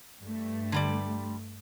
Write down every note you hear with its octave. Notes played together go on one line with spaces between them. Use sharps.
G2 A3
D3 G3 D5